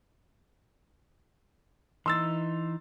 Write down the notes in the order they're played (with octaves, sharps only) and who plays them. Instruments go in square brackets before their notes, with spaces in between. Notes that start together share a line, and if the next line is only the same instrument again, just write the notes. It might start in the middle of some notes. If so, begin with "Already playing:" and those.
[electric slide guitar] E3 D#4 [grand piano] C6 E6 A6